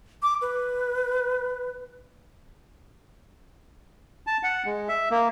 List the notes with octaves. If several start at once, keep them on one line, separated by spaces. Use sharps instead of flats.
D6
B4
A5
F#5
G#3
E5
A#3